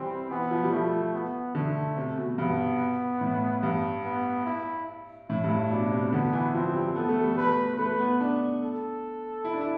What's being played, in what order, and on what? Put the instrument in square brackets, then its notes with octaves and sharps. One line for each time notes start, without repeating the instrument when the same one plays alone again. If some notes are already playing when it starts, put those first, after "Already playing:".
Already playing: [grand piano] E3 G3 [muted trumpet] C4
[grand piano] E3 [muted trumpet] B3
[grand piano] F3
G3
[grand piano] F3 [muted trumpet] A3
[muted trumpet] B3
[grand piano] D3 [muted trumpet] A3
[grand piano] C3
B2
[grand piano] G2 [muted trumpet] B3
[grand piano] A2
G2
[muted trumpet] B3
E4
[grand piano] A2 [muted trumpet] E4
[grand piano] G2
A2
[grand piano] B2 [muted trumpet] D4
[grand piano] C3
[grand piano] D3 [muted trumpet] B3
[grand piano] E3
[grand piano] F3 [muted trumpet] C4
[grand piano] G3
[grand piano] B3 [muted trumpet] A4
[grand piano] A3
G3
[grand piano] A3 [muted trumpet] B4
[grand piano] A3 [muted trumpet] B4
[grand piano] B3
D4
[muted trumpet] A4
[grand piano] E4
D4
E4